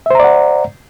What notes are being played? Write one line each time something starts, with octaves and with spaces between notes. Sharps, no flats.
C5 D5 E5 F#5 A#5